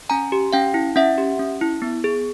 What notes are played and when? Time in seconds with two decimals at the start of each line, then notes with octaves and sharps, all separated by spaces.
0.09 C#4 G#5 A#5
0.32 G4
0.53 C#4 F5 G5
0.74 E4
0.96 C#4 E5 F#5
1.18 G4
1.39 C#4
1.61 E4
1.82 B3
2.04 G#4